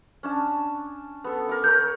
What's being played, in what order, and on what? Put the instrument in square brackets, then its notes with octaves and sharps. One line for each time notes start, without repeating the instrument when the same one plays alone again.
[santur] C#4 D4 A5
B3 A4
A#4 D6
[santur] A4 A#4 C#5 [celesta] G6